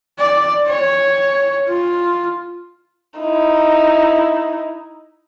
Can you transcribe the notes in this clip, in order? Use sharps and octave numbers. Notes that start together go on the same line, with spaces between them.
D5
C#5
F4
D#4 E4